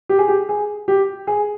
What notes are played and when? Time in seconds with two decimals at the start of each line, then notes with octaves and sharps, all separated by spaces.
0.09 G4
0.19 G#4
0.28 G4
0.49 G#4
0.88 G4
1.27 G#4